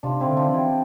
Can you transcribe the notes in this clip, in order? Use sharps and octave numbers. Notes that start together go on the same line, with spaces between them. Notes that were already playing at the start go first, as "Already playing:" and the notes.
C3 D4 F4
C4 E4
D3
D4 F4
E3
E4 G4